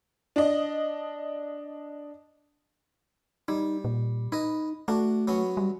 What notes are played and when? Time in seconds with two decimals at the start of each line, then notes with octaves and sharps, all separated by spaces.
0.36 D4 D#5
3.48 G3 D#4
3.85 A#2
4.32 D#4 B4 D#5
4.88 A3 D4 F#4
5.28 F#3 B3 C#4
5.57 G3